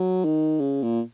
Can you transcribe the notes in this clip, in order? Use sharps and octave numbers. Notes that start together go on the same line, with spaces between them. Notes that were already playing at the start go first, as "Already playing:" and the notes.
Already playing: F#3
D#3
C#3
A#2